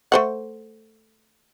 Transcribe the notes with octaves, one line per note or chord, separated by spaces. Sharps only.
A3 C5 F#5